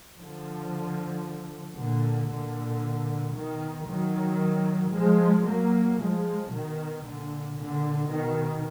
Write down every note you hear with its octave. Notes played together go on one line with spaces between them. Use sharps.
D3 F3
A#2 D3
A#2 D3
B2 D#3
D#3 F#3
F3 G#3
F#3 A#3
F3 G#3
B2 D#3
A#2 D3
A#2 D3
B2 D#3